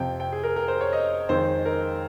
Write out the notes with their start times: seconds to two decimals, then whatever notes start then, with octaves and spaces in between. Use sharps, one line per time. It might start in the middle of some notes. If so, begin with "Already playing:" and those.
Already playing: F2 C3 F3 G5
0.20 G5
0.32 G#4
0.44 A#4
0.56 A#4
0.68 C5
0.81 C#5
0.93 D#5
1.29 F2 D#3 G#3 C5
1.66 A#4